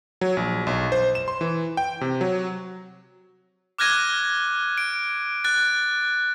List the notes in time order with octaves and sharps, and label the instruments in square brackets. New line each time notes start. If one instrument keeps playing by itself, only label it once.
[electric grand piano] F#3
A#1
B1
C5
E7
C6
E3
G5
C3
F#3
[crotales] D6 F6 F#6 G#6 A#6 D#7
D7
F#6 A6